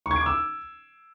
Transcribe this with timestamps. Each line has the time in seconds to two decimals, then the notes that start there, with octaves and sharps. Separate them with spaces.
0.06 C#6
0.11 G#6
0.16 D7
0.21 D6
0.26 E6